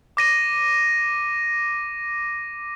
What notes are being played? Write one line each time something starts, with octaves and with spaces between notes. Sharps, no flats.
D6 A#6 D#7